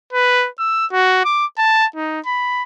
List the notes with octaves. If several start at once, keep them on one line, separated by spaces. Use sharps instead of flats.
B4
E6
F#4
D6
A5
D#4
B5